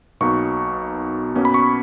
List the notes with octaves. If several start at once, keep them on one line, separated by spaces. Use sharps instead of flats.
B1 B2 A#3 D#4 C#6
B2 A#3 C#4
B5
C#6